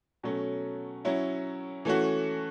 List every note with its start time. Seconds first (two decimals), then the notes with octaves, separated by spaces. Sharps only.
0.23 B2 F#3 A3 C#4
1.05 F#3 C#4 E4
1.85 E3 A3 C#4 F#4